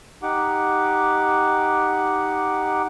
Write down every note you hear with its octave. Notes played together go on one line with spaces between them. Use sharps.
D#4 G4 F#5 D6